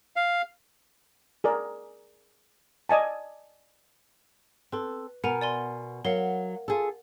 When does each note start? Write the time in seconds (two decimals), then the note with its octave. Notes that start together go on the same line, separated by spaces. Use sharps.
0.16 F5
1.44 G#4 A#4 D5
2.89 D5 D#5 G#5 A5
4.72 C4 A4 B4
5.24 B2 A#4 F#5 G#5 A#5
5.41 D5 G#5 C6
6.05 F#3 A#4 F5 F#5
6.68 F4 G#4 A4